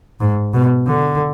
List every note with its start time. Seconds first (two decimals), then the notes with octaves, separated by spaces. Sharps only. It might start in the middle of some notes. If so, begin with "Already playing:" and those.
0.20 G#2
0.54 B2
0.87 D3